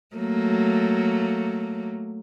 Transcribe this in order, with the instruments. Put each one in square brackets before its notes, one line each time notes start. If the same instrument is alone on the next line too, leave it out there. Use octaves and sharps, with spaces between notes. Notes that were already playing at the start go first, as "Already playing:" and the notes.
[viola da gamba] F#3 A3 A#3